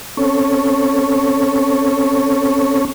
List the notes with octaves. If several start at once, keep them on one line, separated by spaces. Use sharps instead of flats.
C4 C#4 A4 C#5